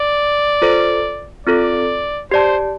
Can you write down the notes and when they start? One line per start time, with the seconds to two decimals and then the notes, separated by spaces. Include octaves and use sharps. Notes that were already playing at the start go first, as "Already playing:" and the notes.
Already playing: D5
0.62 F4 A4 C5
1.47 C4 F4 A4 D5
2.31 G4 C5 D5 A5